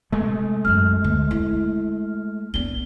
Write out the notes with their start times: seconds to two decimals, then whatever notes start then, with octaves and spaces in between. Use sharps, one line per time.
0.13 C3 G#3 A3
0.65 F#2 F#3 F6
1.04 D2
1.31 E4
2.54 B3 D4 G7